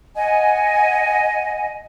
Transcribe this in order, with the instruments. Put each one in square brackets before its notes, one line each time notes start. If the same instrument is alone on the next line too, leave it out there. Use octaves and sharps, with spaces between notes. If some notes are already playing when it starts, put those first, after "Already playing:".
[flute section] D#5 F#5 G#5